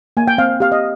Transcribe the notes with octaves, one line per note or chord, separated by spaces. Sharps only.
A#3 G#5
G5
C4 F5
G4 F5
D#5